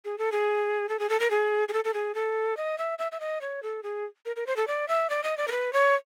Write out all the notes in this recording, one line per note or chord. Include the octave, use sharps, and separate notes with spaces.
G#4
A4
G#4
A4
G#4
A4
A#4
G#4
G#4
A4
A4
G#4
A4
D#5
E5
E5
E5
D#5
C#5
A4
G#4
A#4
A#4
C5
A4
D5
E5
D5
D#5
D5
A#4
B4
C#5